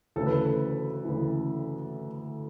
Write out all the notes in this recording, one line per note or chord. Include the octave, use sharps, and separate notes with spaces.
D2 C#3 E3 A4
B4
A4
D2 C#3 E3